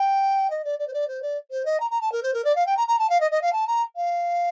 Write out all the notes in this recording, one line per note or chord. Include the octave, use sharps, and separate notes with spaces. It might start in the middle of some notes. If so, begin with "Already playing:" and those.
Already playing: G5
D#5
D5
D5
C5
D5
C5
D5
C5
D#5
A#5
A#5
A5
A#4
C5
A#4
D5
F5
G5
A#5
A#5
A5
F5
D#5
D#5
F5
A5
A#5
F5